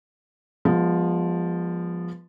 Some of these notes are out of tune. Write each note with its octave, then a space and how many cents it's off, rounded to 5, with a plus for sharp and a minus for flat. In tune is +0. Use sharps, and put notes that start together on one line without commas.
F3 +0 G#3 -30 B3 -20